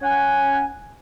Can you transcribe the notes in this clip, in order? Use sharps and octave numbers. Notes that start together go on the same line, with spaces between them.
C#4 F#5 G#5